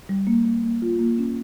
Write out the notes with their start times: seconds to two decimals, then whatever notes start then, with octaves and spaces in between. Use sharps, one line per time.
0.09 G3
0.27 A#3
0.45 A#3
0.63 A#3
0.82 F4
0.99 A#3
1.18 C#4